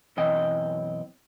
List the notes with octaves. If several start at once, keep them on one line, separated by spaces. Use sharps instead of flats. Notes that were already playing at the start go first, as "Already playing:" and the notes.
B1 F#2 E3 C4 D#5 G5